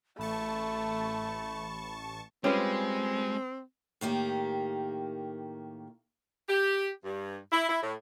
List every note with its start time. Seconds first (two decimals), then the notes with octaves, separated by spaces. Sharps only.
0.19 A1 A3 A5 B5 C#6
2.44 G3 G#3 C4 C#4 F4 B4
4.01 A2 D#3 A#3 G4
6.48 G4
7.05 G2
7.51 E4
7.69 E4
7.83 A2